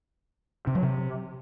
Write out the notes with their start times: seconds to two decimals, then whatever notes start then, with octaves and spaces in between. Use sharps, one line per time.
0.67 C3
0.75 F#3
0.83 C3